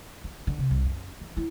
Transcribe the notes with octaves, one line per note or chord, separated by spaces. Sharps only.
D#3
D3
C3
C2
F#2
E3
E4